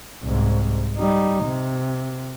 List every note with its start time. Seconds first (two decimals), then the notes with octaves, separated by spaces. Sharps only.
0.23 C2 G#2
0.98 G3 D#4
1.44 C3